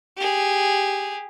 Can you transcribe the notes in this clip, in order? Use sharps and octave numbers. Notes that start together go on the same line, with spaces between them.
G4 G#4